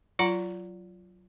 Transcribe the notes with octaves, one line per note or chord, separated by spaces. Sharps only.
F#3 F4 F#5 A#5